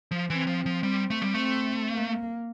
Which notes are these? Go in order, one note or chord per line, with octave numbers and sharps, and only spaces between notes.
F3
E3 C4
F3
F3
G3 C4
A3
G3
A3 C4
A#3